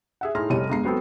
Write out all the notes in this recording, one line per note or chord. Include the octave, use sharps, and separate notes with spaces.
G#4 E5 F#5
A2 D#4 G#4 C6 F6 A#6
F1 G3 C#5 D#7
G1 G#3 A#5 C7
F#3 B3 C4 A4